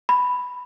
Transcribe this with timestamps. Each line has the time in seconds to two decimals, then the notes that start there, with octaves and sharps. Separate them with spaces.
0.09 B5